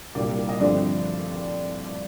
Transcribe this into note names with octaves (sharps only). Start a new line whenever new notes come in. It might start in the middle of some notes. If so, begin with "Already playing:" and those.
C2 A#2 G3 A#3 D4 D5
D#5
G2 D3 F3 A3 C4 D4 D5